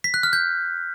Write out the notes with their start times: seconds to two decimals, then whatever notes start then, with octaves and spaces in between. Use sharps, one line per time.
0.04 B6
0.14 F#6
0.23 F6
0.33 G6